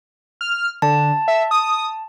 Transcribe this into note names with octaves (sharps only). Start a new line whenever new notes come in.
F6
D3 A5
E5
D#6